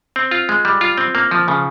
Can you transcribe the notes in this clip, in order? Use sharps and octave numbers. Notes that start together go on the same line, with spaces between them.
C4
F4
G#3
G3
F4
C4
A#3
F3
C#3